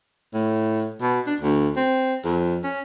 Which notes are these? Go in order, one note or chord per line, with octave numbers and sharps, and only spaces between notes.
A2
B2
D4
D2
C4
F2
C#4